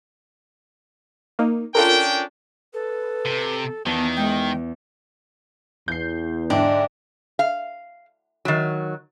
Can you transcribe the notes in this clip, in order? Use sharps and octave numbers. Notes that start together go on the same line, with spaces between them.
A#3 D#4
C#4 D4 F4 A4 A#4 G5
A4 B4
C3
E2 D#3 B3 A5
G#3 G5
E2 G6 C7
G#2 D3 D4 E5 G5
F5
D#3 F#3